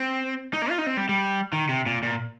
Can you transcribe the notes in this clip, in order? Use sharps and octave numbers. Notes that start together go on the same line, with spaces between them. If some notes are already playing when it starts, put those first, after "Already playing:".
Already playing: C4
D#4
A#3
F4
D#4
C4
G3
G3
D#3
C3
A#2
A#2